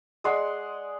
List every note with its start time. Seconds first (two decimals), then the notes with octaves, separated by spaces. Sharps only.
0.24 G#3 D5 F#5 C6